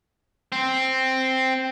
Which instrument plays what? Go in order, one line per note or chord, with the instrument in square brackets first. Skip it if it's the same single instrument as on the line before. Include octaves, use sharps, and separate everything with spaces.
[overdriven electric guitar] C4